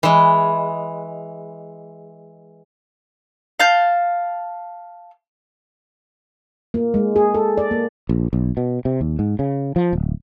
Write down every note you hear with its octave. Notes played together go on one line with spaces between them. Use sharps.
E3 G#3
F5 A5 G6
A#3
G#3
G#4
A4
D5
A#3
A#1
B1
B2
C3
D#2
G#2
C#3
F3
D1